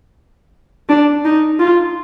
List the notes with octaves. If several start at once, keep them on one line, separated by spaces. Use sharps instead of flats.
D4
D#4
F4